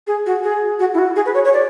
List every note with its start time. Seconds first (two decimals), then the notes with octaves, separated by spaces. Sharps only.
0.07 G#4
0.26 F#4
0.43 G#4
0.79 F#4
0.94 E4
0.98 F#4
1.16 G#4
1.25 B4
1.34 C#5
1.44 C#5
1.53 D5